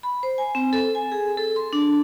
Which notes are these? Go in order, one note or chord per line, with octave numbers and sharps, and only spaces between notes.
B5
C5
G#5
C4
A4
G#5
G#4
A4
C6
D4